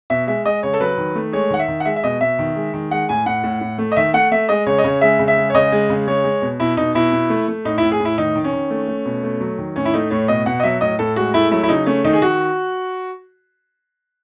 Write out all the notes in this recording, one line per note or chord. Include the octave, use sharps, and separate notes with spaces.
B2 E5
G#3 E5
G#3 D#5
C#3 C#5
A4
F#3 B4
D#3
A3
G#3 C#5
D#3 F#5
E5
D#3
F#5
G#3 E5
E5
B2 D#5
B2 E5
D#3
G#3
D#3
G#3 F#5
A2 G#5
A2 F#5
A2
A2
A3
D#5
D#3 E5
A3 F#5
A3 E5
G#3 D#5
C#3 C#5
D#5
C#3 C#5
G#3 E5
C#3
E5
G#3
C#5
C#3 D#5
G#3
C#3
G#3 C#5
G#3
B2
B2 E4
B2 D#4
B2 E4
B2
A3
A3
A2 D#4
E4
A2
G#4
A2
E4
D#3 D#4
D#3
C#4
D#3
A3
A3
B2
A3
F#3
D#3
A2 C#4
E4
A3 D#4
A2 C#5
B2 D#5
B2 F#5
D#5
F#3 E5
A2 D#5
A2 A4
G#3 F#4
A3 E4
F#3 E4
E4
C#3 D#4
A3 C#4
D#3 D#4
G#4
D#3 F#4